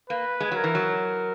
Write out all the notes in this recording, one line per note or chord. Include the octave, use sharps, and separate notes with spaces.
A#3 B4
G#3
F#3 A#4
E3
F#3